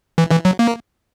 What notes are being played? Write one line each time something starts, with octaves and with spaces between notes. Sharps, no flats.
E3
E3
F#3
A#3